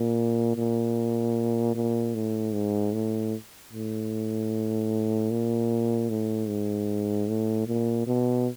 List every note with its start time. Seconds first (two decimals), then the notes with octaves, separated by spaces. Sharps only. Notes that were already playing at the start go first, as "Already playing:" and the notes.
Already playing: A#2
0.56 A#2
1.75 A#2
2.15 A2
2.53 G#2
2.93 A2
3.73 A2
5.31 A#2
6.10 A2
6.48 G#2
7.28 A2
7.67 A#2
8.07 B2